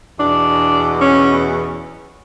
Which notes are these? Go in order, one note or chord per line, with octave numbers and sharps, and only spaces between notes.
E2 B2 D4
C#4